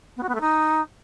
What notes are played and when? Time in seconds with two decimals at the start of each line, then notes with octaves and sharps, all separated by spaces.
0.17 B3
0.23 F#4
0.29 B3
0.35 A3
0.41 D#4